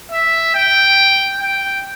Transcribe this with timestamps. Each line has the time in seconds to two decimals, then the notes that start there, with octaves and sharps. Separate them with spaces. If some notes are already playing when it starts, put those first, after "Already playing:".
0.11 E5
0.55 G5
1.40 G5